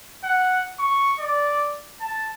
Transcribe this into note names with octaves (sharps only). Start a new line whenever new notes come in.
F#5
C#6
D5
A5